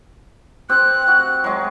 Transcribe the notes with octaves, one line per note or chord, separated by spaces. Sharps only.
C4 G4 F#6
F#4
F#3 G#3